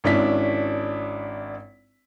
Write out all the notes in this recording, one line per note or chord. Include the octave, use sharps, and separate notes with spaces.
G#1 C#4 D4 E4 B6